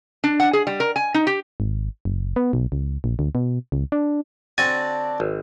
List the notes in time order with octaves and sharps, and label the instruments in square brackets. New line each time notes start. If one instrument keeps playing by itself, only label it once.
[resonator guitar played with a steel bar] D4
F#5
G#4
G3
A#4
G#5
D#4
G4
[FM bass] G#1
F#1
B3
B1
C#2
A#1
D2
B2
C#2
D4
[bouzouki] D3 D4 [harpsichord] C4 F#4 [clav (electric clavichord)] G#5 [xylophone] A6
[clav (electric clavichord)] G#1